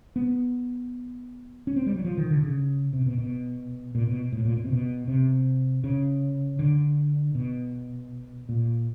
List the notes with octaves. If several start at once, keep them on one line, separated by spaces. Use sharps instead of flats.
B3
C#4
C4
G3
F#3
F3
D#3
D3
C#3
C3
B2
B2
A#2
B2
A2
A#2
B2
C3
B2
C3
C#3
D3
B2
A#2